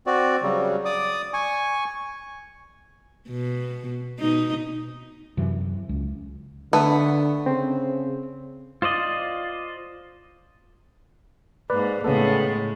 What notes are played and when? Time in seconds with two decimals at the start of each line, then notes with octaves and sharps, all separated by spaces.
0.06 C4 F#4 D5
0.42 C#3 F#3 G3
0.85 D5 D6 D#6
1.33 G#5 C#6
3.29 B2
4.19 B2 D#4
5.37 F#2 C3 E3
5.89 C#2
6.73 D3 A3 B3 B4
7.46 C#3 C4
8.82 F4 C5 D5 D#5
11.70 G#2 A#3 B4 D5
12.04 A2 C#3 G#3 B3 A4